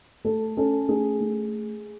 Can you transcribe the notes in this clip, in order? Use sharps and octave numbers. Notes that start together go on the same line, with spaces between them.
A3 A4
C#4 A4
A3 G#4
A3